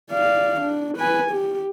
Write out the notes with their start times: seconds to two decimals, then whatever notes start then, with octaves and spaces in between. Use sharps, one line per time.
0.11 D5 F5
0.61 D4
0.98 B4 G#5
1.31 G4